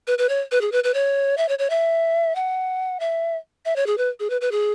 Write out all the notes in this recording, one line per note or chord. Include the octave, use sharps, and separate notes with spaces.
B4
B4
C#5
B4
G#4
B4
B4
C#5
E5
C#5
C#5
E5
F#5
E5
E5
C#5
G#4
B4
G#4
B4
B4
G#4